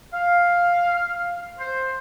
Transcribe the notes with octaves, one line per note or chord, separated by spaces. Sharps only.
F5
C5